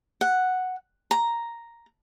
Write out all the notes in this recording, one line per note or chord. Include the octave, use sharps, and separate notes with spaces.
F#5
A#5